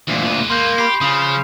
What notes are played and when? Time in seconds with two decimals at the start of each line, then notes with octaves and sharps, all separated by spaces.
0.08 D2 A#2 E3 G#3
0.25 G#3 B4
0.50 A#3 C6 G6
0.78 G4 B5 C7
1.01 C#3 F3 D#6